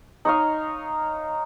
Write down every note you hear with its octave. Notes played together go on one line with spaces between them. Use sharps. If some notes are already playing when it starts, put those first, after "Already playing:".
D#4 C#5 D#5 F5